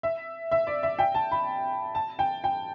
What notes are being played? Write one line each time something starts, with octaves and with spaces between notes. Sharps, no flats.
E5
E5
D5
E5
G5
A5
B5
A5
G5
G5